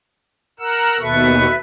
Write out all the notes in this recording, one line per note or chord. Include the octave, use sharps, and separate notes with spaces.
A#4 F#5 E6
D#2 B2 A4 B4 E5 C#6